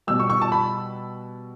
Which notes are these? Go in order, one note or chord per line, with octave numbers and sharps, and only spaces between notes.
B2 G3 E6
C#6
C#6
A5
B5